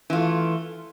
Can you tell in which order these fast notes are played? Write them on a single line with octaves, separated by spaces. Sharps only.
E3 F4 A3